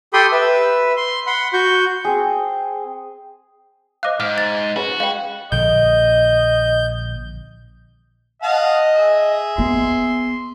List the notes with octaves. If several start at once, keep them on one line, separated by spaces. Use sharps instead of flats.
G4 A4 G5 B5 C6 D#6
B4 E5
C6
F#5 B5 C6
F#4 C#6 G6
C4 G#4
C5 D#5 F5 D6 F#6
G#2 D6 F6
A6
G#3 C#4 F#4 B4
G#3 B4 F5 G5
A#1 D3 D#5 G6
D#5 F5 F#5 A5
G#4 E5
B3 C6